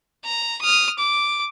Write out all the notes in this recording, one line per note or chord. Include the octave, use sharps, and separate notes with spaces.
A#5
D#6 F6
D6